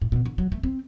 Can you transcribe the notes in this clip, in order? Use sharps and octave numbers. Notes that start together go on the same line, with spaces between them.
A2
B2
D3
F#3
A3
C4